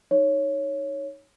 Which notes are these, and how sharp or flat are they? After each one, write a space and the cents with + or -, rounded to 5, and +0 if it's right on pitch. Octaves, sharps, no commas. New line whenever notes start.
D#4 +0 C#5 +0